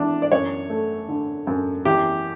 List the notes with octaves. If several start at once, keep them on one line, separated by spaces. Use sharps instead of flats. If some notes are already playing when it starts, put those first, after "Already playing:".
Already playing: E2 D4
D5
F#2 C#5
A3
D3
F#2
E2 G4